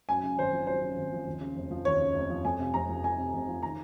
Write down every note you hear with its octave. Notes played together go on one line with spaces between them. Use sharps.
F#2 G#5
C#3
G#1 C5
F3
F#2 C5
C#3
G#1
F3
D#2
C#3
F1
F3
D#2 C#5
C#3
F1
F3
F2 G#5
C3
F1 A#5
F3
F2 G#5
C3
F1
F3
D#3 A#5